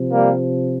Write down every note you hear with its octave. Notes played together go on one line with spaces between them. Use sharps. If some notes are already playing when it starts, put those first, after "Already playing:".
Already playing: C3 F3
G3 A#3